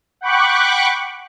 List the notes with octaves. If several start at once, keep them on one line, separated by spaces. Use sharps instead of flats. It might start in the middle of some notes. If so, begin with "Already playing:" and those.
F#5 G5 B5 C#6 D6 F#6